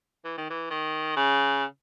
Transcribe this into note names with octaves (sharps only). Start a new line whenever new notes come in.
E3
D#3
E3
D#3
C#3